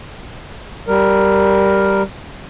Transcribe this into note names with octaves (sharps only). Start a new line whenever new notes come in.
G3 A#4